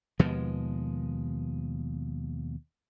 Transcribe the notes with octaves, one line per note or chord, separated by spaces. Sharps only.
D#2 B2 F3 G#3